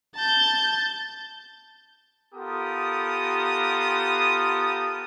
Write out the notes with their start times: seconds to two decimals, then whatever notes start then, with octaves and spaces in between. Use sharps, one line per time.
0.16 A5 G6
2.35 B3 F4 G4 A4 A#4 D#6